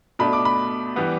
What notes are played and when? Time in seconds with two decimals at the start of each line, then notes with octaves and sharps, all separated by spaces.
0.19 B2 A3 D4 B5
0.33 D6
0.45 B5
0.96 E3 G3 B3